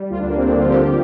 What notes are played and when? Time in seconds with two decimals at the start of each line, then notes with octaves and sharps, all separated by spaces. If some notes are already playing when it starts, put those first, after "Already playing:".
Already playing: G3
0.10 D2 F4
0.19 D4
0.28 D2 A#3
0.37 C4
0.45 D3 D4
0.57 F4
0.63 F3
0.69 G4